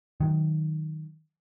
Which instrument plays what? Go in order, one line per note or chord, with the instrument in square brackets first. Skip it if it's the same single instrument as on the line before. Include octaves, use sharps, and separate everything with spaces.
[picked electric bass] D#3 F#3